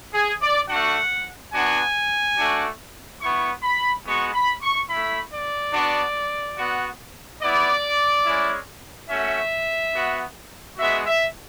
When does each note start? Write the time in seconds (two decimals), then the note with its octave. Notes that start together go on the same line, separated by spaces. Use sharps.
0.14 G#4
0.41 D5
0.69 A3 D4 F#4 F#5
1.53 B3 D4 F#4 G#5
2.38 A3 D4 F#4
3.21 B3 E4 C#6
3.63 B5
4.06 G#3 B3 F#4 C#6
4.34 B5
4.62 C#6
4.89 A3 E4 B5
5.32 D5
5.73 B3 D4 F#4
6.57 B3 F#4
7.41 B3 E4 D5
8.26 G#3 C#4 E4
9.10 A3 C#4 F#4 E5
9.94 B3 F#4
10.78 G#3 B3 F#4 E5
11.06 E5